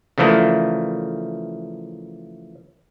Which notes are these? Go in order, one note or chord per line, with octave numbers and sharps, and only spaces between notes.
C#3 E3 F3 A3 A#3 D4